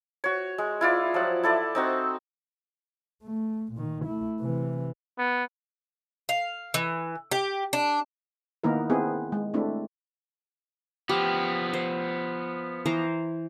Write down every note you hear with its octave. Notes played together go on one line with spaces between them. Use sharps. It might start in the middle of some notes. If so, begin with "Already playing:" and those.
F#4 C#5
G#3
E4 F4 D5
F3 F#3 F#5
E4 A4 D5
C4 D#4 F#4
A3
A#2 D#3
A3 E4
C3 E3
B3
F5
E3
G4
D4
D#3 A#3 B3 D#4 E4 A#4
B3 C4 E4 G#4
G#3
A3 C4 D4 E4
F3 B3 G4
C5
E3 C5 A#5